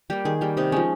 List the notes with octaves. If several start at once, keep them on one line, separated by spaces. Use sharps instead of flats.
G3 A#3 G4
D#3 G#4
G3 A#3
C3 D#4
F3 G#3 C#4